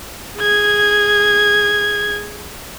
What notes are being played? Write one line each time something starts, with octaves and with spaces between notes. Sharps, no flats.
G#4 G#6